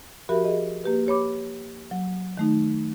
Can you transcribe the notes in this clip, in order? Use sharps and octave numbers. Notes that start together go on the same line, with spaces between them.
F3 F#4 G4 A#4 E5 B5
G#4 D#5
A#3 G4 B4
G4 C#5 B5 D6
F#3
D#3 A3 D#4